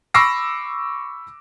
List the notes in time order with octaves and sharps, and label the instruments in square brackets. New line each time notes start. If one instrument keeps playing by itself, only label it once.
[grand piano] B5 C#6 D6 E6 A#6 C7